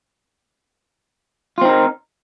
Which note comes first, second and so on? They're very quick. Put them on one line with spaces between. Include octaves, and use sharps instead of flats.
F4 C4 D#4 A#4